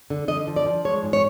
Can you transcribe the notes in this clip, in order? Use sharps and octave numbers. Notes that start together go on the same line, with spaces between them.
D3
D3 D#5
F3
D5
F3
G#3 C#5
G#2
C#5